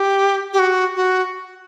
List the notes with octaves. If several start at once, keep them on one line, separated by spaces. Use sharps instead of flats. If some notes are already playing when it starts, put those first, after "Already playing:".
Already playing: G4
G4
F#4
F#4